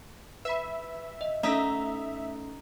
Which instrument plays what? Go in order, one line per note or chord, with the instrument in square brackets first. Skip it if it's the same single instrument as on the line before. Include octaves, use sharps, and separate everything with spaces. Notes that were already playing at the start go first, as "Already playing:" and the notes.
[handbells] B4 B5 [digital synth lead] E5
[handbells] D#5
[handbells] A3 C#4 A4 [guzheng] D#4 [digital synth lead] E5